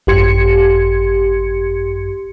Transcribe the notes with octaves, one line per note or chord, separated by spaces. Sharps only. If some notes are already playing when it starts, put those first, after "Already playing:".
G#1 F#2 G4 C6 G#6 C#7